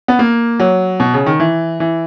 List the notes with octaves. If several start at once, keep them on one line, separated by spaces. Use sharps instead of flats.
B3
A#3
F#3
B2
C#3
D#3
E3
E3